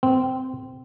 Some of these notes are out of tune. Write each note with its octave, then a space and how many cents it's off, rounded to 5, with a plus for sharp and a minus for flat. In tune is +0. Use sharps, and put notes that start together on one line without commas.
C4 -15